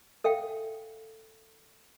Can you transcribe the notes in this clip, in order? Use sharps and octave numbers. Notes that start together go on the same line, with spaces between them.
A4 E5 F5 G5